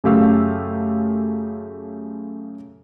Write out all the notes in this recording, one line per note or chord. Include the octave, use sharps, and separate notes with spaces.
F#2 C#3 A3 G4 F5 E6